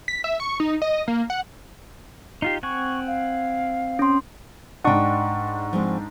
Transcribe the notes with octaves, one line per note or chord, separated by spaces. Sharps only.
B6
E5
C#6
D#4
D#5
A#3
F#5
D#4 F4 G4 C7
C4 F#5 G#5 C#6
F5
C#4 C6
G#2 D4 D#5 F#5 G5 C#6
F3 G#3 C4